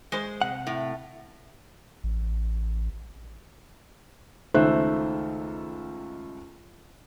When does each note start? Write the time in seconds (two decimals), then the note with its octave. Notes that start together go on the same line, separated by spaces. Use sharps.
0.12 G#3 C5
0.42 C3 F#5
0.67 A2
2.04 A1
4.54 C#2 D#3 A3 C5 E5 F#6